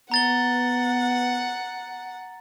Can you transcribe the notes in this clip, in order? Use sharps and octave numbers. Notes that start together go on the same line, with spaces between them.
B3 F#5 A#5 A6 G7